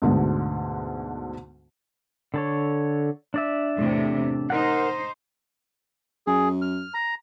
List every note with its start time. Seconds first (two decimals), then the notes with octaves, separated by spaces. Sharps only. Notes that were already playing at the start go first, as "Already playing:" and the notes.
0.02 D2 G#2 B2 D3
2.34 D3 A4 C#5
3.34 D4 D5 E5
3.77 E2 A2 C3
4.50 D#4 A#4 C5 F#5
6.27 F#2 G#4
6.62 F6
6.94 A#5